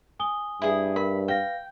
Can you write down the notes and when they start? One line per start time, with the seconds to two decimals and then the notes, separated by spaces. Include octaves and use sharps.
0.20 G#5 D#6 G7
0.62 G2 E4 G#4
0.96 A#4 E5 B5
1.28 B4 F5 G5 A#6